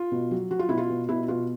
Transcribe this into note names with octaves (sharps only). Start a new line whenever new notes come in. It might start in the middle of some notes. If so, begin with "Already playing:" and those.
Already playing: F4
B2
F#3
F#3 F#4
F4
B2 E4
F4
B2
B2 E4
B2 F4